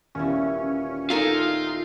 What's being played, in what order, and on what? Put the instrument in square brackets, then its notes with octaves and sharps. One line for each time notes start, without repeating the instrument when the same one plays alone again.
[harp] D#1 B3 E4 [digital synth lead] C#4
[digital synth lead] D#4 [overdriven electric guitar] F4 [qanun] A4 A#4 G#5